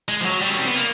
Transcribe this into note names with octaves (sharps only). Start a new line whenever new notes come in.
G#3
F3
F#3
G3
C#4
C4
B3
A#3